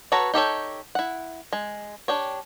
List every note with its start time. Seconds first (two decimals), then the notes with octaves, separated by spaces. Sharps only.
0.12 F#4 A4 B4 C#5 A#5
0.34 D#4 G4 A4 C#5
0.95 E4 F#5
1.53 G#3
2.08 D4 G4 C#5